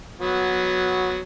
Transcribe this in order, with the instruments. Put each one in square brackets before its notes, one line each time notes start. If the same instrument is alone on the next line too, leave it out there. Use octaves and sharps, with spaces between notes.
[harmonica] F#3 B3